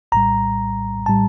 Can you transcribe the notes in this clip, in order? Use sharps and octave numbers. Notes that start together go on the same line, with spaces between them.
A#1 A2 G3 A#5
A2 G3 A5